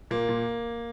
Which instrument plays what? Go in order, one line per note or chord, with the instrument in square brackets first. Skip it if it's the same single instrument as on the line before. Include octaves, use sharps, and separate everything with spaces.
[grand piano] A#2 A#3
A#2